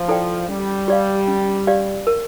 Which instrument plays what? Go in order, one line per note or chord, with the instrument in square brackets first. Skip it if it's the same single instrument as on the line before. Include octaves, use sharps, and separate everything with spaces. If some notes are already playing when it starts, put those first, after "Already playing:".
Already playing: [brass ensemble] F3
[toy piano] E4 A4 D5 G5
[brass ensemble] G3 [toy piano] C#4
[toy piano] G4 D5 F5
C#4
G4 D5 F5
A#4